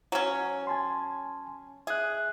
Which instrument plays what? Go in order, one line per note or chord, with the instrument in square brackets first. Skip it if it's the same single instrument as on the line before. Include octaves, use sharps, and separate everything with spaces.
[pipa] F#3 C#4
[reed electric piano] G#5 A5 C6
[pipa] G#4 [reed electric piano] E5 F#6